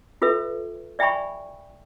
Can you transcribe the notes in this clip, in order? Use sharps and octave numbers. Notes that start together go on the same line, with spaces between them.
F4 A4 B4 E5
D5 E5 G5 G#5 B5 C#6